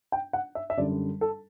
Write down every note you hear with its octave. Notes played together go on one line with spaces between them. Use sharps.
G5
F#5
E5
E5
F#2 D3 G3 D5
A4